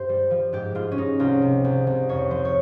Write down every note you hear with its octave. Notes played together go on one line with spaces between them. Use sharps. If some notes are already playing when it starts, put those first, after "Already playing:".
Already playing: G2 C5
G3
F3
G#2 G4
G#2 F4
C#4
G#2 D#4
C2 F4
C3
C2
C2
F2 C#5
F3 C5
C#5